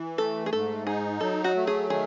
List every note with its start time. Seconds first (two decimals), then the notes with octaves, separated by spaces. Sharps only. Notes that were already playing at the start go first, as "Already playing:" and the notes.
Already playing: E3
0.18 A3 A4
0.46 G#4
0.52 G#2 A4
0.87 D#4 G#4
1.21 F#3 A4
1.44 F#4
1.55 A3
1.67 G#4
1.90 D#3 G#4